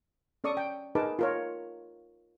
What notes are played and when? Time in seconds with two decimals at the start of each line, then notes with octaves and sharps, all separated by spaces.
0.44 C#4 A4 D5 C#6 D#6
0.57 G5
0.95 D#4 G#4 A#4 B4 A5 D6
1.19 F4 A#4 C#5